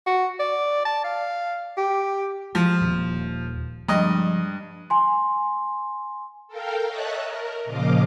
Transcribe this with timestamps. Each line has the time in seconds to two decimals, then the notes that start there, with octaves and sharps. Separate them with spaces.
0.06 F#4
0.39 D5
0.85 A5
1.04 F5
1.77 G4
2.55 F3 G#3
2.81 D#1 D#2
3.88 G2 F3 G#3 D#5
4.90 G#5 C6
6.48 A4 A#4 F5 G5
6.87 C#5 D#5 E5 A5 F#6
7.22 A#4
7.65 A#2 C#3 F3 D#5 F5 D6